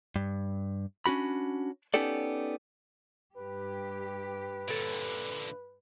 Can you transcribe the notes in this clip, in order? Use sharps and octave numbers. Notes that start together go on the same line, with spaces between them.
G2
C#4 D4 F#4 B5
B3 C#4 D#4 G4 A4 D5
G2 G4 B4
A#2 D3 A4 C#5